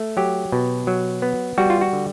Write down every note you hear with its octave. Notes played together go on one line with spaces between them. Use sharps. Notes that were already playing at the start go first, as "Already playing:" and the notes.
Already playing: A3
F#3 G4
B2
F#3
B3
G3 F#4
F4
F#4
D3